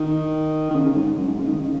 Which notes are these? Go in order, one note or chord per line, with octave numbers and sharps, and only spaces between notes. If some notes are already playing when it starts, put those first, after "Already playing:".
Already playing: D#3
D#3
C#3
C#3
G#2
F#2
G#2
C#3
D#3
C#3